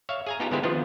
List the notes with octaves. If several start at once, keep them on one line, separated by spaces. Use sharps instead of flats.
C#5 E5 F5
G#4 G#5 A#5
B3 D#4 F4 G4 A5 A#5
D3 G#3 B3 E4 G4 C5
D#3 F3 B3 C4 D4 F4